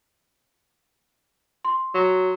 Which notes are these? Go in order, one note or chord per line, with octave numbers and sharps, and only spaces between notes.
C6
F#3